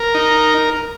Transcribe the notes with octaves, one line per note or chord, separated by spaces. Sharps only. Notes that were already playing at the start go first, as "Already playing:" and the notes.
Already playing: A#4
D#4